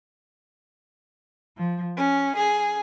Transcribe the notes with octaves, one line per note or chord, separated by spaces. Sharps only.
F3
C#4
G#4